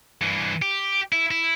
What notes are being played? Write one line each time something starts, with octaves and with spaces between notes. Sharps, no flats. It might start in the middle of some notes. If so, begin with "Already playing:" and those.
G2 E3
G4
E4
E4